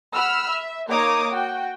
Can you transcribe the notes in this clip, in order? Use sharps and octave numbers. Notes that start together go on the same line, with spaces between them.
F#5 B5 E6 F6
E5
A#3 D#4 C#5 A#5 D6 D#6
F#4 G5